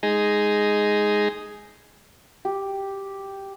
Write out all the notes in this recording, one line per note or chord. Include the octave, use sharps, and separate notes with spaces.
G#3 D#4 G#4
G4